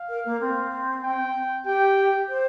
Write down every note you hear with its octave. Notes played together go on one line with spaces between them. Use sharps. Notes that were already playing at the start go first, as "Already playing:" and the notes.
Already playing: F5
A#4
A#3
C4
G5
G4 G5
C5